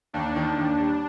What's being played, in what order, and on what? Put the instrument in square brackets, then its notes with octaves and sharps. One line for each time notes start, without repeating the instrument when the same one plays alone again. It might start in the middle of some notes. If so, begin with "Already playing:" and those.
[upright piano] D#2 [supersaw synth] D4
[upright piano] D#3
D#2
G3